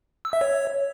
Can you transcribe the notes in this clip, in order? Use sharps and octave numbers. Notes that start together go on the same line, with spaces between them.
E6
E5
C#5